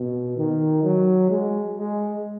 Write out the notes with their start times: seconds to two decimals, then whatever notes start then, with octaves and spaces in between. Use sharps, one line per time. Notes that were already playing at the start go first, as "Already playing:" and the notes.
Already playing: B2
0.37 D#3
0.83 F#3
1.30 G#3
1.77 G#3